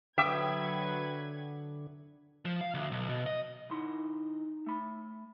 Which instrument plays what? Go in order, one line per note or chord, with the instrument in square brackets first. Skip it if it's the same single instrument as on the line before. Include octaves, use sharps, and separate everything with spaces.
[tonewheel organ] D3 [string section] F#3 B4 G#6 [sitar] E5 [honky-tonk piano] G5 D#6
[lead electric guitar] F3
F5
D2
B1
B2
D#5
[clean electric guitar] D#3 E4 C6 [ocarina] D#4
[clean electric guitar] A3 B5